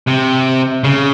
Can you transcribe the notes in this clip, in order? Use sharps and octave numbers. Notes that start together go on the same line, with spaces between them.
C3
C#3